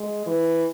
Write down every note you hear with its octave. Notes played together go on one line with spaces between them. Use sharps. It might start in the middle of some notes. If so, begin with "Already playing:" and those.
Already playing: G#3
E3